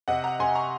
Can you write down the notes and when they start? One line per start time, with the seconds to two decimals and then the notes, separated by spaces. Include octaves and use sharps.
0.08 C3 D#5 F#5
0.24 F#5 A#5
0.40 C3 G#5 C6
0.55 A#5 C#6